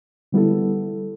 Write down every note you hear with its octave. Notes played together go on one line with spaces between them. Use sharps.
D3 G3 B3 E4 A4